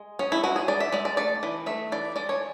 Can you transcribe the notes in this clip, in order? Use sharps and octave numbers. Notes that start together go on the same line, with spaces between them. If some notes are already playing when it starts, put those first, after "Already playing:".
Already playing: G#3
C#4 G#4
E4
G#3 F#4
G#4
G#3 D5
E5
G#3 D5
D5
A3 D5
E3
A3 E5
E3 D5
G#3 D5
C#5